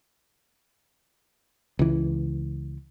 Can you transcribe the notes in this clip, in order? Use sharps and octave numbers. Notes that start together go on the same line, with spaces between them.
C#2 E3